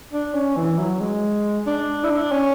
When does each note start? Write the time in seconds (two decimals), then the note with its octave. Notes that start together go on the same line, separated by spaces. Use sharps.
0.13 D4
0.34 C#4
0.56 E3
0.78 F#3
1.00 G#3
1.66 D4
2.04 E4
2.10 D4
2.32 C#4